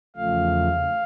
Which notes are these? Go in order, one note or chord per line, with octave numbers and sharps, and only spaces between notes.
E2 C#3 F3 A3 F5